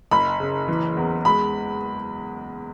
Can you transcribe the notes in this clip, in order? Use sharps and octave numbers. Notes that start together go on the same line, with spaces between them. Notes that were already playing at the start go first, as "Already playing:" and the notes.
F#1 B5
C#3
E3
E2
G#3 B5